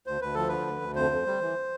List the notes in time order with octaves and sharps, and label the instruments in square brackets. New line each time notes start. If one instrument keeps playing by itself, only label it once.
[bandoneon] D2 C5
D2 B4
F3 A4
D3 B4
D2
D2
F2 C5
F2
G3
E3